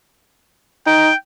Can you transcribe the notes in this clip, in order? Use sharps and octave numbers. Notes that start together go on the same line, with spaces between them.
D#4 G5